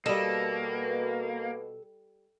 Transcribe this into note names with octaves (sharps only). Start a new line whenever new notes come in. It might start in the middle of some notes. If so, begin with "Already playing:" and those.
B2 G3 A#3 A4 D#5